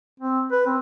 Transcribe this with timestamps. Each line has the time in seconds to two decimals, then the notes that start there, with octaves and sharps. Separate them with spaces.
0.20 C4
0.52 B4
0.66 C4